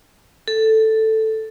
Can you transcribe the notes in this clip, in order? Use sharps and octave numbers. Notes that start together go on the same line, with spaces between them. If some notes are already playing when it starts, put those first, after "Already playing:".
A4